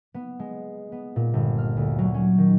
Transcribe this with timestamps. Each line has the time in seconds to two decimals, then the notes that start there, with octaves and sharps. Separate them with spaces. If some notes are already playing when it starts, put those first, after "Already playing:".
0.14 B3
0.39 G#3
0.92 B3
1.16 A#2
1.33 G1
1.58 F6
1.77 D2
1.99 F#3
2.14 C#4
2.38 D#3